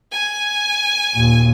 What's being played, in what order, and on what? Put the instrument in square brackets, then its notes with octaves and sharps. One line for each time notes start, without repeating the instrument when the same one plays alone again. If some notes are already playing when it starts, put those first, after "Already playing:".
[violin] G#5
[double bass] D#2 A#2